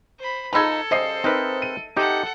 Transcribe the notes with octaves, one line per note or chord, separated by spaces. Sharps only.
C5 B5
F3 D#4 A4 B5 E6 G#6
C#3 G3 C5 D#5 C7
C4 D#4 A#4 B4 D5 E5
D#7
C3 D#4 G4 A4 F#5